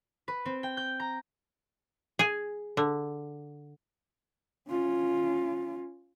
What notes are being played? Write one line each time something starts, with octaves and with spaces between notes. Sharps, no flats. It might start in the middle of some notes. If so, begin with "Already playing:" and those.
B4
C4
G5
G6
A#5
G#4 G#5
D3
C#4 F4